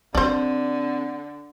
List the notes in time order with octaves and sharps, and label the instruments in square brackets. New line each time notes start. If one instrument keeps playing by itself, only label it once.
[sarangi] D3 [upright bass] C4 [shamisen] D4 C5